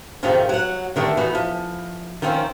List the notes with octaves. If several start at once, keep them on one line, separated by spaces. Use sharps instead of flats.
F2 G#2 C3 D#3 F3
F#3 F#5
D3 D#3 G3 A3
E3 B3 D#4 F#4
F3
D#3 F3 C4 C#4